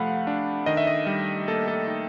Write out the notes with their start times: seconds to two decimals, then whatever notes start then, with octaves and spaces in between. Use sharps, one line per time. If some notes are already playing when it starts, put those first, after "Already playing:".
Already playing: C3 F3 A3 F5 F#5 B5
0.27 D4
0.66 D#3 D#5
0.77 E5
0.87 D#5
1.07 G3
1.48 A#3 A4
1.68 A4
1.87 D#4